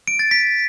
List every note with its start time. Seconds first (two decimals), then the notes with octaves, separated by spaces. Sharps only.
0.07 D7
0.19 A6
0.31 B6